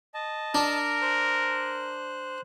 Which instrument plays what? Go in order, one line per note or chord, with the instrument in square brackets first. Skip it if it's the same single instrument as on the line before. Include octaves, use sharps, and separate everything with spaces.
[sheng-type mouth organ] D#5 A5
[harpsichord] D4 [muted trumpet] A#4
[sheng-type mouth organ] C5 F#6